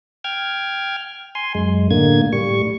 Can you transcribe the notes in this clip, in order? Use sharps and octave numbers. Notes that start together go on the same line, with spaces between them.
G5 F6 G#6
G#5 C6
F#2 G#3
A2 D3 A#3 G#6
A2 G3 C#6